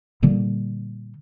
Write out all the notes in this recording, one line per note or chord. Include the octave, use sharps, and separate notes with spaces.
A#2 D3 G3 A#3